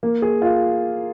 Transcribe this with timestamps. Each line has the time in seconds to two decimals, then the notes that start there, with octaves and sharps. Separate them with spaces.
0.03 A#3
0.22 G#4
0.42 F4